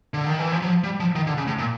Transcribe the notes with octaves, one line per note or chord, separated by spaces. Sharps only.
D3
D#3
E3
F3
F#3
F3
G3
F3
D#3
D3
C#3
A2
A#2